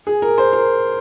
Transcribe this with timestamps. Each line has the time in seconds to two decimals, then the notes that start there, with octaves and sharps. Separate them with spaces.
0.07 G#4
0.22 A#4
0.38 C5
0.53 A#4